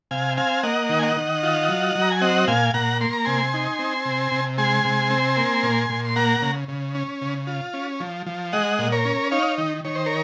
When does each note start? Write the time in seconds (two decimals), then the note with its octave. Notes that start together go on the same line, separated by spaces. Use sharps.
0.11 C3 F5 G#5
0.37 C4 F5 G#5
0.63 A#3 D#5 F#5
0.89 D#3
0.99 G#5
1.03 D#5 F#5
1.16 D#3
1.43 F4
1.69 F#3
1.95 F#3
2.02 A#5
2.11 G#5
2.21 C4 D#5 F#5
2.48 A#2 F5 G#5
2.74 A#2 F#5 A#5
3.01 A#3 C6
3.13 A#5
3.25 C3 G#5 C6
3.53 D#4
3.79 C4
4.05 C3
4.32 C3
4.58 G#3 G#5 C6
4.85 C3
5.10 C4
5.37 A#3
5.63 A#2
5.90 A#2
6.05 C6
6.16 A#3 F#5 A#5
6.42 C#3
6.68 C#3
6.95 C#4
7.21 C#3
7.47 F4
7.74 C#4
8.00 F3
8.26 F3
8.53 G#3 D#5 F#5
8.79 A#2
8.92 A#4 C#5
9.05 C#4
9.31 D#4 C#5 F5
9.58 D#3
9.84 D#3 C#5
9.96 C5
10.06 A#4 C#5